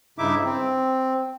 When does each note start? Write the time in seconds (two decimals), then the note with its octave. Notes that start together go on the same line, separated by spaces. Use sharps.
0.18 G2 C#3 D#4 E4 E5 D6
0.45 C4